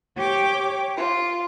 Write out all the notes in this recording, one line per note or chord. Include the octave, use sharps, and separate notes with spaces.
G4 C#5 G5 D6
F4